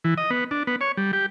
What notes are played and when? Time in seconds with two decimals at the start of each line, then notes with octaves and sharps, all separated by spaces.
0.04 E3
0.18 D#5
0.31 B3
0.51 D4
0.67 B3
0.81 C#5
0.97 G3
1.13 G4